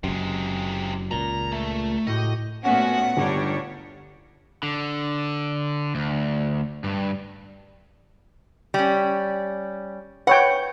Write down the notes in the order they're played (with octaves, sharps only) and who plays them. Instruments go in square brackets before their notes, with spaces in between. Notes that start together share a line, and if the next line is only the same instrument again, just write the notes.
[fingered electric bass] F#1 F#2 [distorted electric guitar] C3 G#3
[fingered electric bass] C#2 A#2 [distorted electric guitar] A#5
[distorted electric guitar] A3
[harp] A2 F#4 G4 [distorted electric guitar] D#5
[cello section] A#2 A3 B3 [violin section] C#4 F#4 [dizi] F#5
[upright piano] G1 [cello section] G3 D#4 C#5 [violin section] D4
[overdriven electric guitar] D3
D2
G2
[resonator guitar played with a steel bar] G3 C#4
[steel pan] B4 C#5 G5 [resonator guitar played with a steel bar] F#5